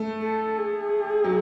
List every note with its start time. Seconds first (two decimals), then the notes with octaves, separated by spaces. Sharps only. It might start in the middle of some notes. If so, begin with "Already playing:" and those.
Already playing: A3
0.22 A4
0.58 G#4
1.24 F#3